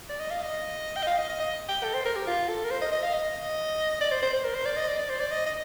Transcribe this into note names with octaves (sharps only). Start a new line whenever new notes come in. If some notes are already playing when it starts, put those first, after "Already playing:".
D5
D#5
F5
D#5
G5
D#5
F5
D#5
D#5
D#5
G5
A4
C5
A#4
G4
F4
A4
A#4
C5
D#5
D#5
F5
D#5
D5
C5
C5
C5
A#4
C5
D5
D#5
D5
D5
C5
D5
D#5
D#5